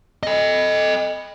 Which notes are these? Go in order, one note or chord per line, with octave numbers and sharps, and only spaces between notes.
A4 D#5